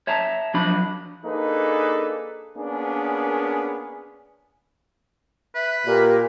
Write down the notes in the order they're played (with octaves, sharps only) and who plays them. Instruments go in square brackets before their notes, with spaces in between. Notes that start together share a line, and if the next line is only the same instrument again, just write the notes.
[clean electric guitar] C#5 E5 A5 A#5
F3 F#3 D4 B5
[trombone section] A#3 D4 D#4 G#4 A4 B4
A#3 B3 C#4 D4 G#4
[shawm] B4 [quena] E5
[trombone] A#2 [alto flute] G4 [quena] A#4